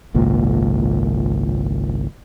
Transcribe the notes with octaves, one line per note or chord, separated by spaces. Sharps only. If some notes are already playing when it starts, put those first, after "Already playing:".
G#1 C#2 A#2